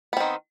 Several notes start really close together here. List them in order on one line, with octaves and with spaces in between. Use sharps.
B3 C4 D#3